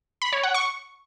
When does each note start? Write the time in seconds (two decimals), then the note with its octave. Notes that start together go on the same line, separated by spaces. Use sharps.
0.22 B5
0.33 C#5
0.43 F#5
0.54 C#6